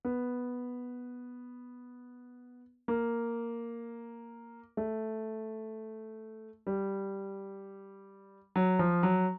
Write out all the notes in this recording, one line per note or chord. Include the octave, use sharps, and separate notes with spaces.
B3
A#3
A3
G3
F#3
F3
F#3